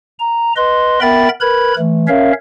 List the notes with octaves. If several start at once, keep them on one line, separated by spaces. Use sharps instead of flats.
A#5
B4 D#5 C6
B3 A#4 E5 G5 B5 A6
A#4 B4 B5 G#6
E3 A3
C#4 A#4 C#5 E5 F5